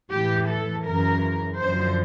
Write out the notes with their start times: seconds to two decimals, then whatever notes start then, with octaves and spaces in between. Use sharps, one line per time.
0.11 A2 E3 G4
0.48 A4
0.85 F#2 C#3 E3 A#4
1.59 F#2 D3 F3 C5